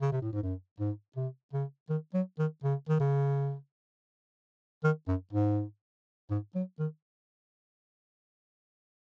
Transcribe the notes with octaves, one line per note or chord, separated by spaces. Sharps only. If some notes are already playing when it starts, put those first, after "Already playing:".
C#3
C3
A2
G#2
F#2
G#2
C3
C#3
D#3
F#3
D#3
C#3
D#3
C#3
D#3
F#2
G#2
G#2
F#3
D#3